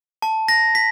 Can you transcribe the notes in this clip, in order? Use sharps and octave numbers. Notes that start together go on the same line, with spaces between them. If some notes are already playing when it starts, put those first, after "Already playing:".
A5
A#6
B6